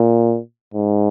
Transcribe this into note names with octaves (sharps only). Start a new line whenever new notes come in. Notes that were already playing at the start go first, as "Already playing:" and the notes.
Already playing: A#2
G#2